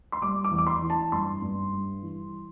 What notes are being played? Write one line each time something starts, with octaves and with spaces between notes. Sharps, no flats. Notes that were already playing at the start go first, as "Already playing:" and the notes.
C6
G3 D6
D6
E2
D6
C6
E3
A5
G2 C6
G2
G3
E3